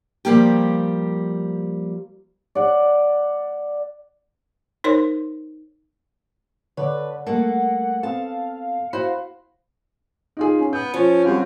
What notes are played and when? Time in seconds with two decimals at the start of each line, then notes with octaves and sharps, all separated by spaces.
0.25 F3 G3 A#3 G4
2.55 D5 F#5
4.84 D#4 A#4 C5 C#5 C6
6.77 D3 B4 C#5 D5
7.27 G3 A3 A#3 A4 F#5
8.03 B3 C4 A4 F5 A5
8.93 E4 F#4 C5 B5
10.37 D#4 F4 G#4
10.59 C#4
10.73 B3 G6
10.94 F3 C#4
11.25 F#2 G3 C4 F4